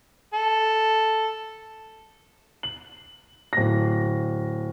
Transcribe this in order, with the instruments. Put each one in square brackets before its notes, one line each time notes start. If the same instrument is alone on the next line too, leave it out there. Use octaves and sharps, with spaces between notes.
[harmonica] A4
[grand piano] F#7
D1 A#6